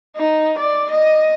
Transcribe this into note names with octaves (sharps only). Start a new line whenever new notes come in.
D#4
D5
D#5